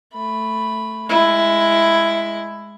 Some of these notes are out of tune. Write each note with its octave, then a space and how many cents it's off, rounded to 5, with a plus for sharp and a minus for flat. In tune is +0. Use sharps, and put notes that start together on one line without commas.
A3 +0 B5 +0
G#3 +0 E4 +10